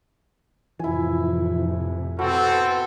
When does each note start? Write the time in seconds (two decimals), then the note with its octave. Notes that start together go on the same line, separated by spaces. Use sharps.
0.80 F2 A2 C3 E3 F3 E4 G#5
2.19 B3 C4 F#4 A4 B4